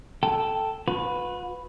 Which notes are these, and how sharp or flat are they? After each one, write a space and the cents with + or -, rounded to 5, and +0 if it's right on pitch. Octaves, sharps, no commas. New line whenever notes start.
A4 +0 G5 +0
F#4 -45 B4 +0